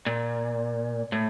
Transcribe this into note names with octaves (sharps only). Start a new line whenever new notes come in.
A#2
A2